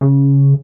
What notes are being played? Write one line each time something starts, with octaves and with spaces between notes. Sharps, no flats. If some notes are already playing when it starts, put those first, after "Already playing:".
C#3